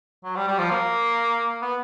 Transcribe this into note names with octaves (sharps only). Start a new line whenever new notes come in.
F#3
G3
G3
F3
A#3
B3